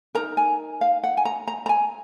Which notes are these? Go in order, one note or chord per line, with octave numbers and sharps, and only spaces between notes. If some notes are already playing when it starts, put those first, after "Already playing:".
D#4 A#4 A#5
G#5
F5
F#5
G#5
A#5
A#5
A#5
G#5